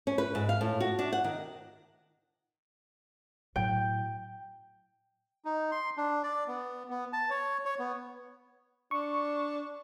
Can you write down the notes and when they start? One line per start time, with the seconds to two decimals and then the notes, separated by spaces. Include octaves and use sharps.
0.07 C#4
0.18 B4
0.35 G#2
0.49 F5
0.61 A2
0.81 F#4
0.99 D4
1.13 F#5
1.24 D#3
3.56 A2 F#3 G5
5.45 D#4
5.72 C6
5.97 D4
6.24 D5
6.48 B3
6.90 B3
7.13 A5
7.30 C#5
7.65 C#5
7.79 B3
8.91 D4 C#6